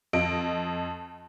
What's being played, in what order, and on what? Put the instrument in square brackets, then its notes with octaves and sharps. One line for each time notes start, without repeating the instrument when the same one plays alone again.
[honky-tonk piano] F2 D#5 D7